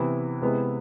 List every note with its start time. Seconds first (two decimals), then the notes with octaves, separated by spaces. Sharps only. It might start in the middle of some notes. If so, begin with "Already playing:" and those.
Already playing: C3 E3 B3 E4
0.41 C3 G#3 B3 E4